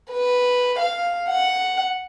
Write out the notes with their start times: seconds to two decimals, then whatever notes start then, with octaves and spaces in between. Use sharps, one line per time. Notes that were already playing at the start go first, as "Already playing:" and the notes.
0.12 B4
0.79 F5
1.28 F#5